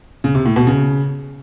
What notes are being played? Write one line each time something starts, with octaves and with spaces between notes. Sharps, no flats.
C#3
C3
A2
B2
C#3